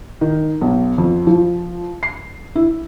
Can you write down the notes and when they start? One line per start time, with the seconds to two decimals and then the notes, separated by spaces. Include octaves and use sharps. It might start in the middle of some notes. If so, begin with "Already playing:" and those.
0.21 D#3
0.61 B1
0.98 F2
1.27 F3
2.03 C7
2.56 E4